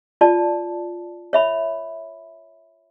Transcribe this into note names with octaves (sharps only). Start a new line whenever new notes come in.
F4 D5 A5
C#5 E5 B5